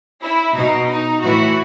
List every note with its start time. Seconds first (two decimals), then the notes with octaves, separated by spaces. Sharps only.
0.22 E4
0.56 B2 D#4
0.89 D#4
1.22 A2 E3 F#4